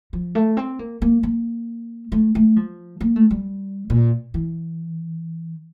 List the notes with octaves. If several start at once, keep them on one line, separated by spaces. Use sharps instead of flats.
F3
A3
C4
A#3
A#3
A#3
A3
A3
F3
A#3
A3
G3
A#2
E3